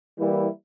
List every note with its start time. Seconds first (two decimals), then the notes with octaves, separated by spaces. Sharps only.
0.17 E3 G3 A#3 E4